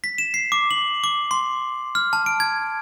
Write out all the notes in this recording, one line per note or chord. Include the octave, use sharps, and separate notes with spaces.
B6
E7
C7
D6
F#7
D6
C6
F6
A5
D7
G#6